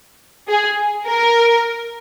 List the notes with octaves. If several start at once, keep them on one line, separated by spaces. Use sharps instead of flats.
G#4
A#4